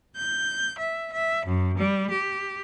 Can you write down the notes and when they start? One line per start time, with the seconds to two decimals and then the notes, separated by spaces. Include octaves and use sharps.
0.15 G6
0.77 E5
1.12 E5
1.45 F#2
1.77 G3
2.10 G4